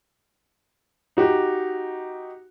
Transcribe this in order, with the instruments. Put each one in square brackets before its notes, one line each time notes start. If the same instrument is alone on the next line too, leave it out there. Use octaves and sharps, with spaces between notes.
[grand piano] D#4 F#4 G4